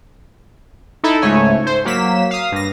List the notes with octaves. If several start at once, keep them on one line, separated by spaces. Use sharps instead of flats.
D#4 E4 A4
C#2 G#2 A3 C#5 G#5
C5
F#3 A#3 B6 E7
F5 D#6
G2 A#6